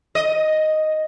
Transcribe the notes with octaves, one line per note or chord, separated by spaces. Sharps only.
D#5